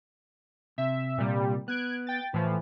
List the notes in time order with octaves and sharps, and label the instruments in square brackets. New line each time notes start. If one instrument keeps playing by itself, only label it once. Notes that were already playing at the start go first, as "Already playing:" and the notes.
[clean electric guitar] C3 [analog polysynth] E5
[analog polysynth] A#2 G3
[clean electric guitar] B3 [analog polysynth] F#6 G#6 D7
[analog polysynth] G5 A6
[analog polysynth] A2 F3 [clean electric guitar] E3 B4